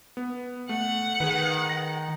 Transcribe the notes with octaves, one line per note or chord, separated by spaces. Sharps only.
B3
A3 F#5
D#3 G#4 B4
A#6